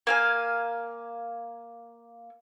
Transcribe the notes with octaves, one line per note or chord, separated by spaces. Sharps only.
A#3 F5 G#5